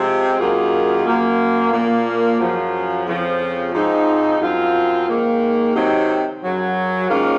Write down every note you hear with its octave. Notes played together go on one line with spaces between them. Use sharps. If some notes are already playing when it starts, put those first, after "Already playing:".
Already playing: C3 F3 G#3 C4
F#2 D#3 A#3 F4 G#4
F#2 F3 A#3
A#2 F3 A#3
F#2 C#3 F3
F2 C#3 F3
G#2 F3 C4 D#4
F#2 F3 C4 F4
G#2 D#3 A#3
C3 D#3 F#3 C4 D#4
F#2 C#3 F#3
G#2 D#3 A#3 C#4 F4